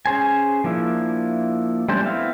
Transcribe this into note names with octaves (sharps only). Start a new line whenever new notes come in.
C#4 G#4 C5 G#5
F3 A#3 D4 E4
G3 A3 C#4 D4 C5
B3 C4 E4 F5